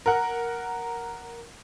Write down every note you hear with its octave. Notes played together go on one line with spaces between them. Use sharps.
A#4 F#5